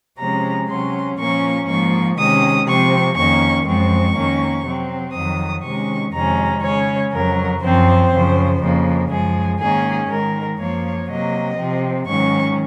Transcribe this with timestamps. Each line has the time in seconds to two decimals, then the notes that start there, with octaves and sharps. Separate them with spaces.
0.19 C3 F3 G#3 C#4 A#5
0.68 C3 F#3 C#4 C6
1.18 A#2 F3 A#3 C#4 C#6
1.67 G#2 F3 A#3 C#6
2.17 C3 D#3 G#3 C#4 D#6
2.66 C3 F3 C4 C#6
3.16 F2 D#3 A#3 C#4 C#6
3.65 F#2 F3 G#3 C4 C#6
4.15 F2 D#3 A#3 C#4
4.65 C3 F#3 C4
5.13 F2 D#3 F#3 D#6
5.64 C3 D#3 G#3 C#4 C#6
6.13 F2 C3 D#3 G#3 C#4 A#5
6.62 C#3 G#3 C#4 C#5
7.12 F2 C#3 F#3 A#4
7.62 F#2 F3 C4 C5
8.11 F#2 C#3 F3
8.61 F2 C#3 F3 A#3
9.10 F#2 F3 G#3 G#4
9.60 G#2 D#3 A#3 C#4 G#4
10.09 G#2 D#3 G#3 A#4
10.59 F#2 F3 A#3 C#5
11.08 C3 F#3 A#3 D#5
11.58 C3 F3 C4
12.07 G#2 D#3 F#3 C#4 C#6